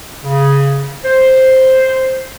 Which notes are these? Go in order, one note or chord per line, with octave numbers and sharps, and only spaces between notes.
C#3
C5